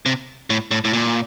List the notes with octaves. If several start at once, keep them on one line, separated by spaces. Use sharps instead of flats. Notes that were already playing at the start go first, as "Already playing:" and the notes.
C3
A2
A2
A2
A#2